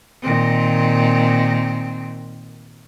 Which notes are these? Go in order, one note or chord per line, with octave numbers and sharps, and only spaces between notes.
A#2 D#3 C4